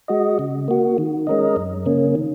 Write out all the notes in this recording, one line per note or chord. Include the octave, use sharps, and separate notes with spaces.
G#3 F#4 D#5
C#3
A#3 F#4
D#3
G#3 C#4 A#4 D#5
F#2
C#3 A#3 C#4
D#3